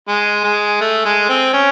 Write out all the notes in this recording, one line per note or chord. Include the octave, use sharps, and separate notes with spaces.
G#3
G#3
A3
G#3
C4
C#4